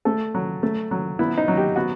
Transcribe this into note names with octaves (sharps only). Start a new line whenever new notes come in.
A3 A4
F#3
A3
F#3
B3 E4
D#4
F#3
G4
B3 F#4